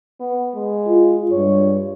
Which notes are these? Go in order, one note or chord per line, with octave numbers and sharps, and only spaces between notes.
B3
G#3
F4
G2 C#5